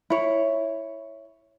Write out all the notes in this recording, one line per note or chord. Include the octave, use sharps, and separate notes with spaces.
E4 C#5